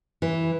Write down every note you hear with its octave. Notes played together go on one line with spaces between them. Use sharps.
E3